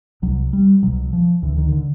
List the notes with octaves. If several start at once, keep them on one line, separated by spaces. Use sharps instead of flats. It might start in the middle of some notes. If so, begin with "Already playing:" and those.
C2 C3 F#3
G3
C2 B2 F#3
F3
D2 D3 E3
D#3
D3